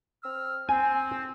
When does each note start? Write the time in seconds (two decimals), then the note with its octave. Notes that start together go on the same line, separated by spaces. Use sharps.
0.23 C4 E6 F6
0.69 C4 G#5